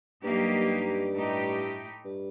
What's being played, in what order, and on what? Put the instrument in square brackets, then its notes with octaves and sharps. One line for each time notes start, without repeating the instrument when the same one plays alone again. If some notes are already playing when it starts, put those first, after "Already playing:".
[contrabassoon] G2 [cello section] F#3 A#3 D#4 G4
[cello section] A2 A3 D#4 G4
[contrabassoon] G2